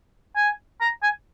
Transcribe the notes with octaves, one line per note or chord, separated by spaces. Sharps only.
G#5
A#5
G#5